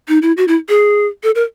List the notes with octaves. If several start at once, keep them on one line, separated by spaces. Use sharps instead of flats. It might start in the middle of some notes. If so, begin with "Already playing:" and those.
D#4
E4
F#4
E4
G#4
A4
A#4